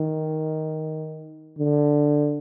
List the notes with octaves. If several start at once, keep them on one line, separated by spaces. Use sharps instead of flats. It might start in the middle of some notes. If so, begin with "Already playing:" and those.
Already playing: D#3
D3